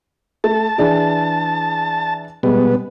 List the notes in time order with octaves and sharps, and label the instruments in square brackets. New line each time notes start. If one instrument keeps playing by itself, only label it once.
[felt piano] A3 [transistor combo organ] A5
[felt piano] E3 D4 G#4
[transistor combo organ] B2 B3 [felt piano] G3 G#3